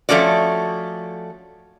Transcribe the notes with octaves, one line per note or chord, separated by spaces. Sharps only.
F3 A3 C#4 F#4 D5